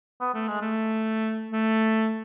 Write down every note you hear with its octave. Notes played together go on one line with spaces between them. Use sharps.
B3
A3
G#3
A3
A3